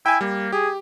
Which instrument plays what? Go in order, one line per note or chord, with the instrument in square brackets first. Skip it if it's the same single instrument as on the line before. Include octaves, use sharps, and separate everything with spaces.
[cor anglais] E4 [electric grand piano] G5 G#5
[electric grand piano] G3 [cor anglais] A#3
[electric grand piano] G4 [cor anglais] G#4